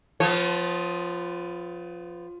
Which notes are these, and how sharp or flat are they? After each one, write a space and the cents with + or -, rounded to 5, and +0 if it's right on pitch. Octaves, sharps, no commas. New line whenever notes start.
F3 +0 B3 +35 C#5 -35